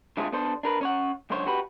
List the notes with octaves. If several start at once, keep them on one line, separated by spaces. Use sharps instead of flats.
D3 G#3 A3 C4 F4 G#4
B3 D4 A4 C5
D4 A#4 B4
C#4 C#5 F#5
C#2 F#2 D3 C5 C#5
F#4 G4 B4